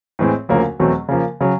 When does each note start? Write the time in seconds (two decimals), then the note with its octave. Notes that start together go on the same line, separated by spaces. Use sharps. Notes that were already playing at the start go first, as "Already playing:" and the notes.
0.19 A2 E3 G#3 C4
0.49 D2 C#3 F3 A#3 C#4
0.80 E2 B2 F#3 A3 C4
1.09 C#3 F3 A#3
1.41 C#3 F#3